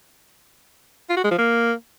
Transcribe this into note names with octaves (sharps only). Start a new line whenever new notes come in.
F4
F#4
G#3
F3
A#3